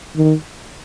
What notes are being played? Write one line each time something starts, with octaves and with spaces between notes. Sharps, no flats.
D#3